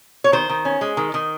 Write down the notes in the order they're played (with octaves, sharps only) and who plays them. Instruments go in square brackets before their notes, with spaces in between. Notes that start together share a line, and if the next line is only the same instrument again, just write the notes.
[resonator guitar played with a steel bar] C#5
D#3 C5
D#3
C#4
G#3
D#3
D#3